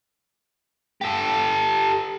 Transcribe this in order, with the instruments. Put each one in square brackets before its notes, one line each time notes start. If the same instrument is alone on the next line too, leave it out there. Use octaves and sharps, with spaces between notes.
[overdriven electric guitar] G4 A4